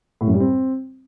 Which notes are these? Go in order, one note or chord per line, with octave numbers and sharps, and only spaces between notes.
A2
F#2
G3
C4